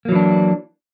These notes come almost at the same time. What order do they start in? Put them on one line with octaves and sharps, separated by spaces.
A#3 F#3 E3 D4